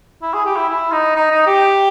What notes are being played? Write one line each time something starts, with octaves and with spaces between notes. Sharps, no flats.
E4
G#4
G4
E4
E4
D#4
D#4
D#4
G4